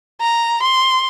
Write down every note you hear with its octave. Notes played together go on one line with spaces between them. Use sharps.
A#5
C6